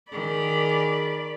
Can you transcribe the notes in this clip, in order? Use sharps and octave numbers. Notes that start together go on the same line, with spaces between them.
D#3 G#4 D5 B5